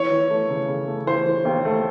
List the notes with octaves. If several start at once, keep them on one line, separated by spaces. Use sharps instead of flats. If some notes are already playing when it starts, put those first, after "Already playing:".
Already playing: E3 C#5
E3
A3
C#3
C#3
A3
E3 C5
E3
D#2
A3